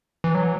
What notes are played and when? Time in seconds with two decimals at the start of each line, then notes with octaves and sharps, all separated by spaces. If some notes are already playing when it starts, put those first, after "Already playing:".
0.24 E3
0.35 F#3